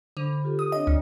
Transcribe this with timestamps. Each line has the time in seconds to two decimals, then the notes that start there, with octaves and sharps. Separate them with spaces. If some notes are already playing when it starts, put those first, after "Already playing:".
0.17 D3 C5 B5
0.44 F4 G4 A4
0.59 D#6
0.72 C4 D4 C#5 D#5
0.87 D2